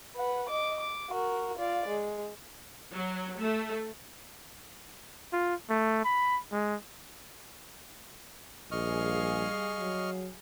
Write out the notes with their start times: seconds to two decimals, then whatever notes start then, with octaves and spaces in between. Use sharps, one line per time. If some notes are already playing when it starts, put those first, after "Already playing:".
0.16 B4 F#5
0.49 D#5 D6
0.80 D6
1.10 F#4 A#4
1.57 F4 D5
1.88 G#3
2.93 F#3
3.39 A3
5.33 F4
5.70 A3
6.05 B5
6.52 G#3
8.72 A#1 G3 G#4 D#5 F5 C#6 F6
9.79 F#3